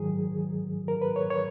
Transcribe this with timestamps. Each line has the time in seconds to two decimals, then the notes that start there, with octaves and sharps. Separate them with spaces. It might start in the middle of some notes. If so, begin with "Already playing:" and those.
Already playing: G#2 D#3 F#3 G#4
0.88 A#4
1.02 B4
1.16 C#5
1.30 C#5